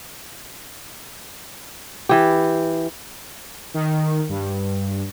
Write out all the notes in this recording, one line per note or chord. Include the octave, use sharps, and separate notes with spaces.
E3 G4
D#3
G2